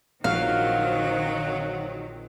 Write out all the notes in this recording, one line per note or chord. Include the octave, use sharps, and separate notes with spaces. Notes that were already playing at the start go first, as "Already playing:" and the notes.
A#1 D#3 F#3 C4 F5